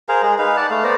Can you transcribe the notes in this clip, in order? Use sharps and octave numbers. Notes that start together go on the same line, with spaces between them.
G#4 A#4 C5 F5
G#3 G#4
D#4 B4 F5
D5 F#5 A5
A3 F5
B3 C5 D5 A#5